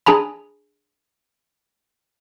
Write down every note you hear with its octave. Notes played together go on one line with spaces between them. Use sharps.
D4 G#4 G#5 A#5 B5